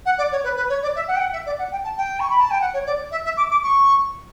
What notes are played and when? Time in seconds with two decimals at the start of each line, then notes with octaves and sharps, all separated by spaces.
0.06 F#5
0.18 D5
0.32 C#5
0.44 B4
0.56 B4
0.69 C#5
0.82 D5
0.95 E5
1.08 F#5
1.16 G5
1.20 F#5
1.33 E5
1.46 D5
1.59 F#5
1.72 G5
1.84 A5
1.97 G5
2.20 C#6
2.30 B5
2.40 A5
2.51 G5
2.61 F#5
2.73 C#5
2.86 D5
3.11 E5
3.25 E5
3.37 D6
3.51 D6
3.63 C#6